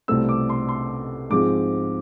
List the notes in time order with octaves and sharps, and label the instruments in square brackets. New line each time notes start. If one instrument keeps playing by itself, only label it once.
[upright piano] C2 B2 A3 C4 E6
D6
C6
C6
G#2 F3 G#3 C4 D6